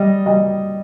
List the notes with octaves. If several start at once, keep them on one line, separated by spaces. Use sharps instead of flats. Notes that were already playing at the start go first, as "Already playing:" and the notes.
Already playing: G3 D#5
G3 D#5